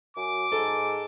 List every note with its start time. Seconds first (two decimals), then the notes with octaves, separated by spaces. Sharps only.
0.16 F#2 D6
0.52 G#2 A4